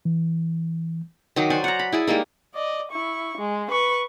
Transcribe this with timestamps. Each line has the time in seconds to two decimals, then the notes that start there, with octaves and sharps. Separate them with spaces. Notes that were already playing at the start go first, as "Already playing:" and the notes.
0.05 E3
1.36 D#3 F#3 D#4 D6
1.50 C5 D5 F#5 G#5
1.64 F#5 A#5
1.79 B5
1.92 E4 G#4 D5
2.07 G3 G#3 A#3 D#4
2.54 D5 D#5
2.91 E4 C#6
3.38 G#3
3.71 B4 C#6